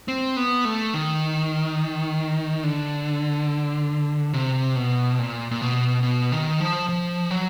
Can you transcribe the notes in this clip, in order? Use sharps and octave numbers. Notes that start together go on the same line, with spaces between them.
C4
B3
A3
D#3
D3
C3
B2
A#2
A#2
B2
B2
D#3
F3
F3
F#3